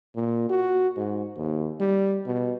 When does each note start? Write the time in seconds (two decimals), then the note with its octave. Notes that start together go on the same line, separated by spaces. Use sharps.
0.15 A#2
0.49 F#4
0.97 G#2
1.37 D#2
1.80 G3
2.26 B2